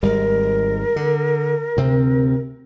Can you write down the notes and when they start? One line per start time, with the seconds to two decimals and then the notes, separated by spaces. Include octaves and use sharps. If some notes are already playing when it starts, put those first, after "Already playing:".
0.03 G#1 G3 G#3 A#4
0.96 D3
1.77 D2 C3 C4